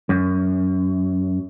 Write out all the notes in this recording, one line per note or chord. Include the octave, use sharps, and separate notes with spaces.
F#2